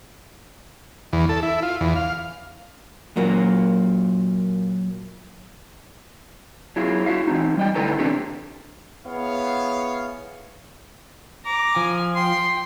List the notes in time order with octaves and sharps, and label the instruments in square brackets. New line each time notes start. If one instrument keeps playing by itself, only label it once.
[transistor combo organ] E2
A4
E4
F4
E2
F5
[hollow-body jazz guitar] A#2 F#3 A#3
[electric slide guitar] F#3 E4 F4 G#4
E4 F#4 A4 E5 F5
E3 C4 D#4
G3 D#5 G5
A2 D3 E4 A4 B4 A#5
C3 E3 C4 D4 G4 A4
[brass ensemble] B3 E4 G#4 C#5 F5
[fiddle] A#5 [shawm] D6
[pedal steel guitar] F3 [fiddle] G#5
[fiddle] G5 [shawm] C6